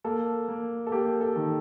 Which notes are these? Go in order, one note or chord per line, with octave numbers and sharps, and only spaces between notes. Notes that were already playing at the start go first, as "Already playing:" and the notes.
A#3 A4
A#3
A4
A#3 G4
A4
D#3